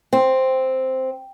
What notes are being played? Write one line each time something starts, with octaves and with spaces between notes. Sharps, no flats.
C4